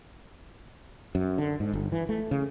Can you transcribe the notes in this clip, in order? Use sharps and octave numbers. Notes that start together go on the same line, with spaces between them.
F#2
D3
G#2
G1
E3
A3
C#3